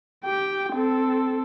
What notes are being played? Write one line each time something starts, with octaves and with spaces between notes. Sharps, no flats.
G4 G5
C4 A4